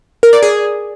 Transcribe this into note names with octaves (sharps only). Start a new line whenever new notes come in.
A#4
D5
G#4